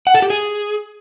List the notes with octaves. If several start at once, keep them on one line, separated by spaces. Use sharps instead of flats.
F#5
A4
G4
G#4